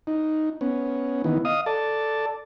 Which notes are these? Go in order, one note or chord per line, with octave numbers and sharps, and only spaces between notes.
D#4
B3 C#4
D#3 E3 B3
D#5 F5 D#6
A4 D5 A5